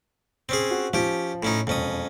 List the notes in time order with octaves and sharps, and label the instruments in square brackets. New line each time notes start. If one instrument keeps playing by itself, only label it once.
[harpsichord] C4 C#4 G#4
[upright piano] F#4
[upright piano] F3 [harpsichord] C#4 G4
[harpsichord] A2 C#4 D#4
[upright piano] E1 [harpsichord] F2 C#4 D#6